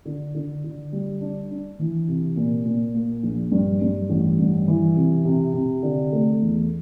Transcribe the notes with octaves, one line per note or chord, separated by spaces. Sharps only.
D3
D3
D3
G3
D4
D4
E3
C3
A#2
A#2
A#3
A#1
G2
G2
A1
G2
E3
C3
C3
C3
D3
A3
E2